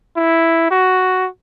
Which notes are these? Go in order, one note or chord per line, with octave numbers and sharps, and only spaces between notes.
E4
F#4